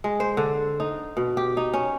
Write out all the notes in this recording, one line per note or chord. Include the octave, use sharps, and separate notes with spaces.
G#3
C5
D3
D#4
B2
G4
D#4
C#4